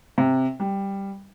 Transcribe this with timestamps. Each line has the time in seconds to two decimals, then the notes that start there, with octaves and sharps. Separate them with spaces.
0.18 C3
0.60 G3